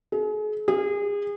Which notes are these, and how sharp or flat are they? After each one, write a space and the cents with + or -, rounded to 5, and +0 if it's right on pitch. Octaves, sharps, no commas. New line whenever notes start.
G#4 +40
G#4 -30